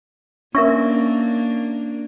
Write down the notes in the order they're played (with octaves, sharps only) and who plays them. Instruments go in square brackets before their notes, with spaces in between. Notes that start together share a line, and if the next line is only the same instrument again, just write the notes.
[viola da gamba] A#3 D4 [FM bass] C#4 [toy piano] A#4 E5 C#6